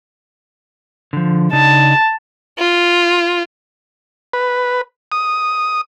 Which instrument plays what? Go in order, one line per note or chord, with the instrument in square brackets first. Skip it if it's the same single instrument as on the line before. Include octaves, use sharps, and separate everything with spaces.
[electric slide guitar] D3 F3
[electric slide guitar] C#3 D4 D#4 [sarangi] A5
[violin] F4
[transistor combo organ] B4
D#6